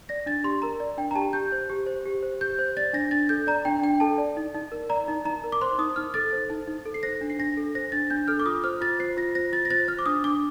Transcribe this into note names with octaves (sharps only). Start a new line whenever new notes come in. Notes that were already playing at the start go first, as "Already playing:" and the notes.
D5 A#6
D4 A6
G4 C6
A#4 A#5
D5
D4 G5
A#5
G4 A5
G4 G6
C5
G4
C5
G4
C5
G4 G6
C5
D5 A6
D4 A#6
D4 A6
A4 G6
D5 A#5
D4 G5
D4 G5
A4 A5
D5
D#4
D#4
A#4
D5 A#5
D#4
D#4 A#5
A#4
D6
C5 C6
D#4 D#6
D#4 F6
A4 A6
C5
D#4
D#4
A4
C7
C5 A#6
D4
C7
D4 A#6
A4
C5 A#6
D4 A6
D4 G6
A4 F6
D6
F4 D#6
C5 F6
F4 A6
C5 C7
F4 A#6
C5 A#6
F4 A6
A#6
C5 A6
C5 F6
D6
D4 D#6
D4 D6